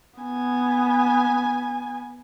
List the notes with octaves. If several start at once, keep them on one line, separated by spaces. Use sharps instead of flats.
B3 G#5